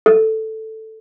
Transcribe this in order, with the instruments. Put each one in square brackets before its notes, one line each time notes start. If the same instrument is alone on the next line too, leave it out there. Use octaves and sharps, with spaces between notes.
[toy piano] A4